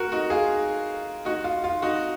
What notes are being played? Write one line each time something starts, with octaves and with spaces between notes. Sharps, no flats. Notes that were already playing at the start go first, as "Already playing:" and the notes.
Already playing: F#4 A#4
D#4 F#4
F4 G#4
D#4 F#4
F4
F4
D#4 F#4